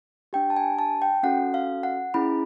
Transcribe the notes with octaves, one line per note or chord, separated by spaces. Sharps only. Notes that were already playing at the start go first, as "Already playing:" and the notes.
D4 G4 G5
A5
G#5
A5
G5
C#4 F#4 A4 F#5
F5
F#5
C#4 E4 G#4 B5